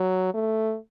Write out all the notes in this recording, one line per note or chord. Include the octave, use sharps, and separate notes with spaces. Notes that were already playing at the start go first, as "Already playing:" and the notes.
Already playing: F#3
A3